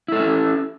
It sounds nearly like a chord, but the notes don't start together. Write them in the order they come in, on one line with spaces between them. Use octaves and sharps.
E4 A4 E5 C#4